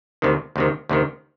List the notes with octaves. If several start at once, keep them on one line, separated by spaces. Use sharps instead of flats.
D2 C3 D#3
D2 C3 D#3
D2 C3 D#3